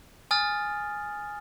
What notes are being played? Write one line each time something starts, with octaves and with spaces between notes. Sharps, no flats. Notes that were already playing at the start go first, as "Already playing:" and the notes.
G#5 D#6 F6 A6